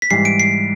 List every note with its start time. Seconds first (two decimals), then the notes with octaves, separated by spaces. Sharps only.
0.02 B6
0.10 G#2 E3 G3 C7
0.25 D7
0.40 C7